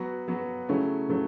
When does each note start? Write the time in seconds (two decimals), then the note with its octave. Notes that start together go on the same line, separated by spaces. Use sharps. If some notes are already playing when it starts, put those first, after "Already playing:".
Already playing: F#3 B3 F#4
0.28 F#3 B3 F#4
0.69 C#3 F#3 A3 C#4 E4
1.09 C#3 F#3 A3 C#4 E4